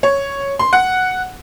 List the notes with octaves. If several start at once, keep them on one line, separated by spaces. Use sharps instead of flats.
C#5
C6
F#5